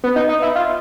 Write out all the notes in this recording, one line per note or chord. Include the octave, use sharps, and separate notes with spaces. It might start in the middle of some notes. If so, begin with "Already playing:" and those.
B3
D#4
D#4
E4
F4